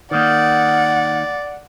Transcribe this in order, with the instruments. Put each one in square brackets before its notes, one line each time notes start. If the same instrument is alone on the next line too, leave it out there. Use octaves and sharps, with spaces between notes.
[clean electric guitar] D#3 A#3 [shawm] D5 [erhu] F#5